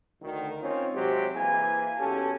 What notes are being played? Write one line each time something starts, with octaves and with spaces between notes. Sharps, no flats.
D2 D#3
C4 C#4 D#4 F4 C5 C#5
C3 F#3 G#3 G4 C5
E3 A#3 E4 G#4 G#5
B1 C#4 G4 A4 G#5 A5